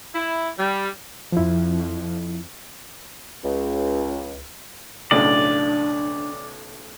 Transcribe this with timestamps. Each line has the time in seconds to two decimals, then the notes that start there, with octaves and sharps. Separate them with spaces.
0.14 E4
0.58 G3
1.32 F2 F3 E4
3.44 C#2
5.11 B1 A2 C#3 D4 D5